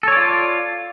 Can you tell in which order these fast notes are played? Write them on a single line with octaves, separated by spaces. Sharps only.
A4 C#5 D5 F4